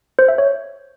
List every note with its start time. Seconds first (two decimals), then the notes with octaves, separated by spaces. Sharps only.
0.19 C5
0.28 E5
0.38 C#5